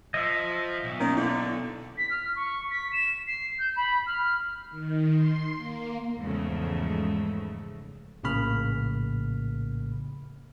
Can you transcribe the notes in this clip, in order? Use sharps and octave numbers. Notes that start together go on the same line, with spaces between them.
F3 D#5 E5
B1
D#3 A#3 C#4
D3 E4
B6
F6
C#6
B6
E7
C7
G6
B5
F6
D#3
C6
A#3
E2 G#2 C#3 F3 A3
A#1 A2 C#3 A#3 B5 F6